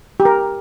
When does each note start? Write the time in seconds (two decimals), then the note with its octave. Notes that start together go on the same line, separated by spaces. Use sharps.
0.20 G4
0.25 A#4